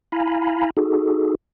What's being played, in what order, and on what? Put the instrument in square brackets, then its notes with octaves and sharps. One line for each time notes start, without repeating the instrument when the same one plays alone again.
[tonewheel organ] E4 F5 G#5 A#5 B5
D#4 F#4 G#4 A4